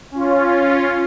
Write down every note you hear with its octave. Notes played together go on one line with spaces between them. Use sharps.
C#4 F4